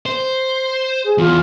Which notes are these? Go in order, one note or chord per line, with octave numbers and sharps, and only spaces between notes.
C5
G#4
E2 F4